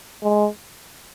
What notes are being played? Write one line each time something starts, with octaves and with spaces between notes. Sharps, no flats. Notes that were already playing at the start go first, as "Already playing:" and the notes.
G#3